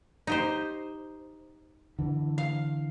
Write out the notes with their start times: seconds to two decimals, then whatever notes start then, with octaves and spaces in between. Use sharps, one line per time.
0.27 D#4 G4 C5
1.99 D3 E3
2.38 F5